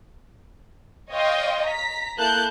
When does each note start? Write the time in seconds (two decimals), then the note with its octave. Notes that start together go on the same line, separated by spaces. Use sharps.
1.12 C#5 D#5 F5 G5 C6
1.67 A#5 B6
2.18 A#3 E4 A4 A5 F#6 G6